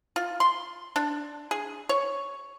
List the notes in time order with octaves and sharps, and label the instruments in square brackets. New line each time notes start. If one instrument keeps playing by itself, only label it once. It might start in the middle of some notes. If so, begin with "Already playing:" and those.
[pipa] F4
C6
D4
G#4
C#5